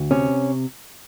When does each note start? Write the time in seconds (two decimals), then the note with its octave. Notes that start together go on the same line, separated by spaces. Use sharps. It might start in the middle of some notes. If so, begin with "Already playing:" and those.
Already playing: D2
0.11 C3 C#4